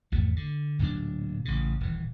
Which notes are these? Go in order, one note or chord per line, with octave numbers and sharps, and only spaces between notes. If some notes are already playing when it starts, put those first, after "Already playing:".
G#1 E2 A3
D3
D1 A#2 F#3 D4
A1 C#3
D#1 E3